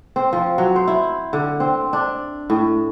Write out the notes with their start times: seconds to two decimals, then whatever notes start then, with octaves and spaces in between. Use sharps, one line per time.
0.16 C4
0.33 F3
0.58 F#3
0.76 C5
0.88 E4
1.33 D3
1.60 C4
1.93 D4
2.50 A2